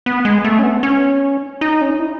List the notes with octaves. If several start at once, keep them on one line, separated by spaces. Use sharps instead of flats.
B3
G#3
A3
C#4
B3
C#4
D#4
C#4
D#4
E4